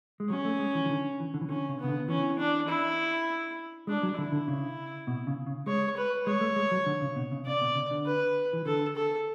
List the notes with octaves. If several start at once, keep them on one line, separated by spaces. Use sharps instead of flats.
G#3
F#3 C#4
A3
G#3
E3
E3
D3
E3
D3
E3
D3 C#4
C#3
C#3 B3
D3
E3 C#4
D4
E4
G#3 D4
F#3
D3 E4
D3
C#3
B2
C#3
C#3
G#3 C#5
B4
G#3 C#5
A3
G#3
F#3
D3
C#3
B2
C#3
C#3 D5
B2
C#3
D3
B4
E3
D3 A4
A4